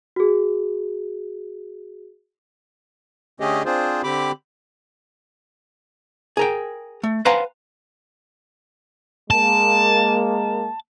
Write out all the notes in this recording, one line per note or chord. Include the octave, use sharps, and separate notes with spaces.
F#4 G#4
D3 A3 C#4 G4 G#4 D#5
C4 D4 F4 G#4 C5
D3 C4 G4 B5 D6
G#4 A#4 G5
A3
B4 C5 F5 F#5 G#5 A#5
G#3 A#3 A5